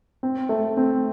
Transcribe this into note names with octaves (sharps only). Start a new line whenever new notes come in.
C4
A3
C4